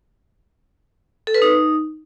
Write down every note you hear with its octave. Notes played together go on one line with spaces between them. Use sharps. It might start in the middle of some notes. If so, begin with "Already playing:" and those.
A4
B4
D#4